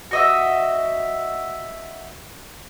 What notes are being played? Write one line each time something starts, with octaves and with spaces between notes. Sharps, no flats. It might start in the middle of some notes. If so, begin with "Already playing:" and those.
F#4 D#5 E5